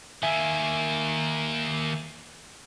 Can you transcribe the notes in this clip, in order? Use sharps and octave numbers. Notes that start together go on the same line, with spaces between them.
D#3 A#3 E5 G#5